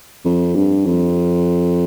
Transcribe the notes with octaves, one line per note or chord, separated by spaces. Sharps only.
F2
G2
F2